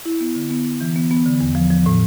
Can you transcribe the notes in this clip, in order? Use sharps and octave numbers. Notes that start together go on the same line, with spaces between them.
E4
B3
D3
B3
B3
E3
B3
B3
D3
E2
F3
F3
A2